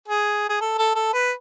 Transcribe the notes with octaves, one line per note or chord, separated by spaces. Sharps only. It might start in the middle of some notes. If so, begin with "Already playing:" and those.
G#4
G#4
A4
A4
A4
B4